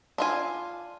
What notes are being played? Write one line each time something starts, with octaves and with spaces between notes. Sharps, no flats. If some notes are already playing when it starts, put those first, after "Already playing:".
D4 F4 G#5